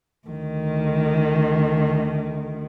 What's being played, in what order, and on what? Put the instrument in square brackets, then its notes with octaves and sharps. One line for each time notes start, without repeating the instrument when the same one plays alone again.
[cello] D2 D#3